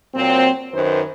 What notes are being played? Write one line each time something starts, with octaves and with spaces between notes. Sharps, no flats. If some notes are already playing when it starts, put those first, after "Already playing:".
A#2 F#3 C4
F#2 D#3 B4 C5